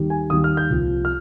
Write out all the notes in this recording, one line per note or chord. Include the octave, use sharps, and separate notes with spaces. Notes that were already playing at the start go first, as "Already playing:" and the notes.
Already playing: D#2 D#3 G3
G#5
D#2 D#3 G3 D#6
F6
G6
C2 A#2 F3
F6